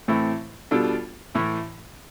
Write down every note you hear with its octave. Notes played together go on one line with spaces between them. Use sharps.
A2 E3 A3 C4 E4
B2 G3 D4 F4 A4
A2 E3 A3 E4